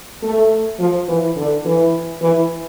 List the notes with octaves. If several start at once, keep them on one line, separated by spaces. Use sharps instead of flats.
A3
F3
E3
D3
E3
E3